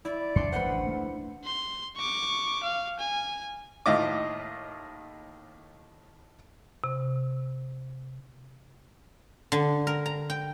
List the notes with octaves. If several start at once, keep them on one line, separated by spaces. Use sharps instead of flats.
E4 D5
F2 D4 C6 C#7
A1 D2 B4 C5 F#5
D2 F#3 A3
C6
C#6 D6
F5
G#5
D#2 A2 F4 D#5 E5 D6
C3
D3
A#4
A#5
G5